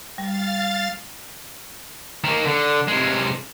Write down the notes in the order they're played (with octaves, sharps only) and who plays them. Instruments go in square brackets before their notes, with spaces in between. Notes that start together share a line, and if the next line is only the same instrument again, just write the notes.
[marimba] G3 [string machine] F5 A6
[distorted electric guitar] D#3 A#3
D3
C3 G#3